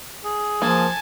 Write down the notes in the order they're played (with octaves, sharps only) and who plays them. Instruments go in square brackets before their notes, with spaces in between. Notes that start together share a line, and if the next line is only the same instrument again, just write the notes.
[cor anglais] G#4
[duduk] F3 [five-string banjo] A#3 [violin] G#5 A5